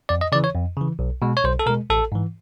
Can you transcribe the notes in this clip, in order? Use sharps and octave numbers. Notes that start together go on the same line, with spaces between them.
F2 D5
D#5
C#3 E3 D5
C#5
F2
C#3 E3
B1
B2 G#3
C#5
B1 C5
A4
B2 G#3 A#4
A1 A4
G#2 E3